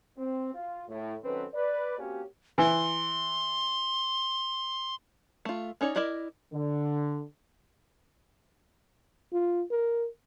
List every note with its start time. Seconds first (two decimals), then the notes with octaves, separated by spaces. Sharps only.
0.18 C4
0.54 F4
0.89 A2
1.24 D#3 F#3 C4 C#4 A4 B4
1.54 B4 D5
1.98 A#3 C4 C#4 F#4 G4
2.58 E3 C6
5.45 A3 F4
5.81 C#4 D#4 C#5 D5
5.96 E4 A#4 D5 D#5
6.53 D3
9.33 F4
9.71 A#4